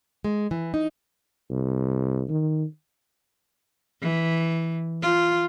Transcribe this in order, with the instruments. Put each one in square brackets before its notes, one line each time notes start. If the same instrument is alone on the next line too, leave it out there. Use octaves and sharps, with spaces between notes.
[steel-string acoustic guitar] G#3
E3
D#4
[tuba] C2
D#3
[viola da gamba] E3
F4